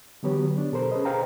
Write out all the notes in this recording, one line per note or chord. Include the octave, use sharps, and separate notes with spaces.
D3 E3 F#3 B3 G4 C#5
D4
B2 A4 A#4 C5
C#4 G#4 B4 D#5
G#4 C5 D#5 F5 G5 A#5